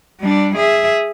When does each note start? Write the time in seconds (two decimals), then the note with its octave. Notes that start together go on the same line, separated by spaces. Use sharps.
0.20 G3 D4
0.56 G#4 E5